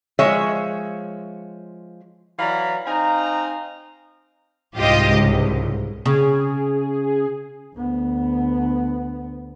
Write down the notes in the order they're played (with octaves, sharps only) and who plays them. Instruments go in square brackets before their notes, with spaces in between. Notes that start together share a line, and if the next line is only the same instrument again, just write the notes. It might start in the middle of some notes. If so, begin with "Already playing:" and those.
[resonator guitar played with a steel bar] F3 G#3 C#5 E5
[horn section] E3 F#3 D5 F5 A#5 B5
C4 D#4 F5 G#5 A#5
[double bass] C2 G#2 [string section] F4 G4 D#5
[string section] C#2
[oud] C#3 [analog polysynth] G#4
[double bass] D2 B3